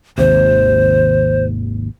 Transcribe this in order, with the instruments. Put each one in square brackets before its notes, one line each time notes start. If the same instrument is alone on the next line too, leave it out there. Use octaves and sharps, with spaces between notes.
[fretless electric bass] G#1 D#2 C3 [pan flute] C5